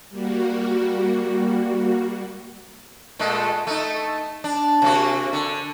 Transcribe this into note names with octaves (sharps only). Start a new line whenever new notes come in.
G3 A#3 F#4
A#2 G#3 A3
A3 D#4
D4
C3 A#3 F#4
D3